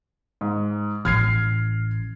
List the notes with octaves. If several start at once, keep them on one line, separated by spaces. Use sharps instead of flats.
G#2
A1 F6 G#6 C7